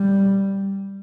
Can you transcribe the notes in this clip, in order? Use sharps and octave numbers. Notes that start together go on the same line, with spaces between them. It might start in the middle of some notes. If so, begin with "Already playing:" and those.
Already playing: G3